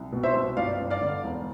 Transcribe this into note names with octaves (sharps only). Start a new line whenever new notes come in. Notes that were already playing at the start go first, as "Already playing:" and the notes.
Already playing: C2
B2
C5 E5
C2
G1 D5 F5
G1
D5 F5
D3
E1